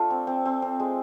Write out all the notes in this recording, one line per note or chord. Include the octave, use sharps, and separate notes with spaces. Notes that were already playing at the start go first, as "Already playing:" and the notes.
Already playing: A3 D4 F4 A4
C4
C4
C4
C4
G#3